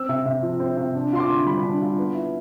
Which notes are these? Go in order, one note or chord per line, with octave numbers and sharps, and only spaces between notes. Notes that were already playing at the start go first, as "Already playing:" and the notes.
Already playing: C4 E6
C3
C3
F3
C4
C3
D4
F4 C6
D6
D3
G3 B5
D4
F4
B3
E4